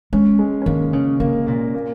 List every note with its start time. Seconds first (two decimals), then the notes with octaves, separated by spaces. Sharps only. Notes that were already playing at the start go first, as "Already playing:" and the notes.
0.13 G#3 C#4
0.39 G#3
0.62 C#4
0.66 D#3 A#3
0.93 C#3 C#4
1.20 C#3 A#3
1.47 A#2 A#3
1.75 A#3